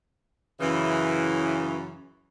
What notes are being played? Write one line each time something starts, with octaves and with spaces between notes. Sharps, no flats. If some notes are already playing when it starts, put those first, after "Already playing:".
F#2 C#3 E3